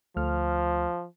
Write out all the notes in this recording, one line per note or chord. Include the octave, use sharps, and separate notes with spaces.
D2 F3 A3 F6